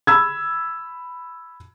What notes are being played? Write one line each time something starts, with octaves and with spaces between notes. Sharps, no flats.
B5 E6 G#6